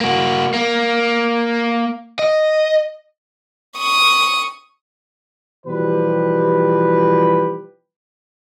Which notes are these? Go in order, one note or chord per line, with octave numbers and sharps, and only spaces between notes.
A#3 F#4
A#3
D#5
C#6 D#6
B2 E3 F3 G3 G4 B4